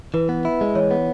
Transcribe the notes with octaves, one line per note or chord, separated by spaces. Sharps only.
E3 B4
B3
E4
G#3
E3 C#5
B3